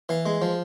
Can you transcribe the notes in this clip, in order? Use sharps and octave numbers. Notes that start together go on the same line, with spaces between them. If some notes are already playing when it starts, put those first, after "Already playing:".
E3 F5
G#3
F3